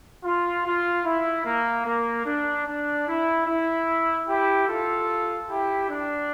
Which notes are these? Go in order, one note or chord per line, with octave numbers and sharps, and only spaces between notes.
F4
F4
E4
A#3
A#3
D4
D4
E4
E4
E4 G4
F4 A4
E4 G4
D4